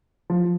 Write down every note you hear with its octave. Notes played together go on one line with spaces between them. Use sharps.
F3